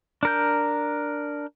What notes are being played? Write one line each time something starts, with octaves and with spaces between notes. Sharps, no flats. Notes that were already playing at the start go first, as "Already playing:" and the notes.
D4 A#4 G6